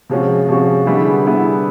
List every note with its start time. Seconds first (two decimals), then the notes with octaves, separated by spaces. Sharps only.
0.10 C3 F3 G#3 C#4 F#4
0.49 C3 F3 G#3 C#4 F#4
0.86 D3 G3 B3 E4 G#4
1.25 D3 G3 B3 E4 G#4